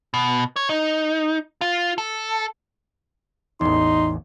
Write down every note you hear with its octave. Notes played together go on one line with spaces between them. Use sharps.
B2
C#5
D#4
F4
A4
A1 E2 D#4 C6